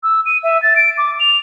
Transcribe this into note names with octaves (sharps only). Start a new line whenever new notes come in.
E6
D#7
E5
A6
D7
D6
F7